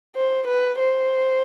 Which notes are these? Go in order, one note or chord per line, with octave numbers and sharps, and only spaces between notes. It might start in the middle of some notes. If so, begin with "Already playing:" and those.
C5
B4
C5